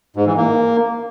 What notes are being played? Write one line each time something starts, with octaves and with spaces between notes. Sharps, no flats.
G#2
E3
A#3